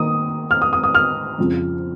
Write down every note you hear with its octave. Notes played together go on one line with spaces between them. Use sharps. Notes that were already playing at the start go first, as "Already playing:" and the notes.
Already playing: D#3 A#3 D#6
F6
D#6
D#6
D#6
F6
F2 C#3 F3